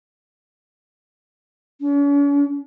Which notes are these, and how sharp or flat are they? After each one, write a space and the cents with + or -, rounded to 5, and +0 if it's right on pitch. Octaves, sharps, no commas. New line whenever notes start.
C#4 +45